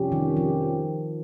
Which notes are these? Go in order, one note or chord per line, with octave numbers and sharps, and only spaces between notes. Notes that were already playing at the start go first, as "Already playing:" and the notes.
Already playing: F2 C3 G3 C#4 G4
D#3
F3